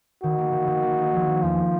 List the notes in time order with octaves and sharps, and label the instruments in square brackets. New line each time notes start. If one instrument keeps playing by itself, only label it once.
[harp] D#3 [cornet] F#4
[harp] A#3
D#3
D#3
A#3
D#4
F3
A#3
[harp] E2 [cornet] F4